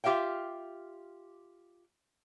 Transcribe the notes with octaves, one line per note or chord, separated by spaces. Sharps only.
F4 G4 E5 F5 G5